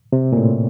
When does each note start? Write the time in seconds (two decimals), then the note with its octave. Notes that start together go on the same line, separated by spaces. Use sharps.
0.13 C3
0.32 A#2
0.37 A2